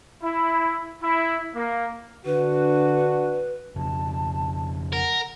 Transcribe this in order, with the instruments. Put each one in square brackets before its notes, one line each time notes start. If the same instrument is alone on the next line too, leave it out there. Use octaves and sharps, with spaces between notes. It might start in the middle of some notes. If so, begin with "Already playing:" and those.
[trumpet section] E4
E4
A#3
[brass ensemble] D3 D4 F#4 [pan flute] B4
[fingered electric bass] F2 C#3 [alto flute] A5
[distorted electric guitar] A#4 [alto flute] F#5